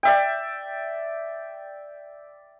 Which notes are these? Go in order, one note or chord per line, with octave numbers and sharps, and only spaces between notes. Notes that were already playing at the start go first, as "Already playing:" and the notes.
D5 E5 G5